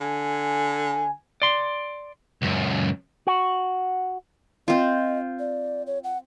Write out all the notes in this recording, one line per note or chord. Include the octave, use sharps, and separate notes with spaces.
D3 G#5
D5 C6
C#2 F#2
F#4
C4 F4 D#5
D5
C#5
F#5